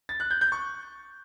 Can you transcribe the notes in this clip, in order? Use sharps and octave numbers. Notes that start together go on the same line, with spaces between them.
A6
F#6
G6
G6
C#6